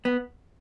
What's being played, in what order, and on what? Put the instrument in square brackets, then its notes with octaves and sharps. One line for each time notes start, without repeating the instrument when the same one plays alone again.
[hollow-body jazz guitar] B3